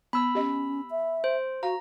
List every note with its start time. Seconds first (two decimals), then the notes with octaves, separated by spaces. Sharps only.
0.13 B3 B5 E6
0.35 C#4 G4 D#5
0.91 E5
1.24 C5
1.63 F#4 F5 A#5